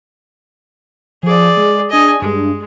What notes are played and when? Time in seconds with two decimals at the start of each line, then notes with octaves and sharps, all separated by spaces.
1.23 F3 G#4 D5
1.57 G#3
1.91 D4 G#4 D#5 G#5
2.22 G2 G#3